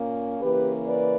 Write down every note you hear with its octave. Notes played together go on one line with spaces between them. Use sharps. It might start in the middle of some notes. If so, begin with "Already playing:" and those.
Already playing: A#2 A#3 C#4
C#3 E3 A#3 C#4 G4 B4
B4 D5